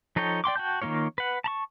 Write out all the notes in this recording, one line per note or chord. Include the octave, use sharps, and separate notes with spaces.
F3 D#4 A4 C#5 G5
D5 G5 C6 D6
F#4 G5 A5 G6
D#3 G3 A#3 F4 C#5
B4 F#5
A5 A#5 C#6